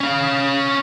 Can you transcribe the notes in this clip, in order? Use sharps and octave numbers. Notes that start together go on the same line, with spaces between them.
C#4 F5